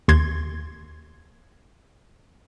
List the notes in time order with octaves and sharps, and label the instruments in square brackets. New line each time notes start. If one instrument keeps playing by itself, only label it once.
[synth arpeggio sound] D#2 C6 G#6